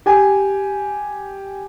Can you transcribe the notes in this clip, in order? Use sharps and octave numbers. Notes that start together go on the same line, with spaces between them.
G4 G#5